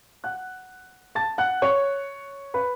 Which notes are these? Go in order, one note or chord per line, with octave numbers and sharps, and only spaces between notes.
F#5 F#6
A5 A6
F#5 F#6
C#5 C#6
B4 B5